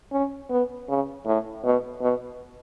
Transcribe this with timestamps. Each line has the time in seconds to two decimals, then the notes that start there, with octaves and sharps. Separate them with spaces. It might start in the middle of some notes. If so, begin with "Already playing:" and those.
0.12 C#4
0.50 B3
0.89 C#3
1.26 A2
1.64 B2
2.01 B2